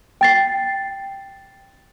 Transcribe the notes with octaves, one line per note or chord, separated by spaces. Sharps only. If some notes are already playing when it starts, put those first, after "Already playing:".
G5 A6 C7